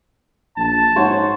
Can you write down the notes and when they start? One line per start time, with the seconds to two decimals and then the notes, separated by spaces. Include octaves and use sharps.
0.57 A#1 A5
0.96 G#2 C5 C#5 F#5